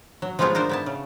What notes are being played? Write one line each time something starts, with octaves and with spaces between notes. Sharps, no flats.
F#3
F3 G#3 B3 D#4 F4 G#4
D4 D#4 A#4 C5
B3 E4 A5
C#3